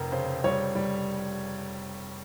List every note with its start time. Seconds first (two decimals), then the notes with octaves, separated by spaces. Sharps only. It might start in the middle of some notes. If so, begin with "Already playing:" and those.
Already playing: F1 F2 A#4
0.12 C#3 C5
0.44 G3 C#5
0.75 G3